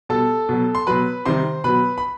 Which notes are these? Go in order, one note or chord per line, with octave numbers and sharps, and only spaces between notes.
B2 G3 A4 A5
B2 F#3
C6
B2 F#3 B4 B5
C3 D#3 G3 C5 C6
B2 F#3 B4 B5
B5